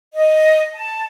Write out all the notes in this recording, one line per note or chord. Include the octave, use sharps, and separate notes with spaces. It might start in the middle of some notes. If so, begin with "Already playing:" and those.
D#5
A5